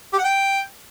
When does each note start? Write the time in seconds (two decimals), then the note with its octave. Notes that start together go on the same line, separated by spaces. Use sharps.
0.13 G4
0.18 F#5
0.24 G5